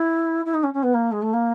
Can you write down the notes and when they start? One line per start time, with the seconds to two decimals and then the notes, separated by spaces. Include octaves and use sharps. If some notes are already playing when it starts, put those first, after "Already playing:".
Already playing: E4
0.46 E4
0.54 D#4
0.64 C#4
0.74 C#4
0.83 B3
0.94 A#3
1.12 G#3
1.22 A3
1.33 A#3